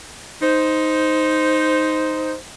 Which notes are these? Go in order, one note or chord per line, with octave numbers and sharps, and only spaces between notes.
D#4 C5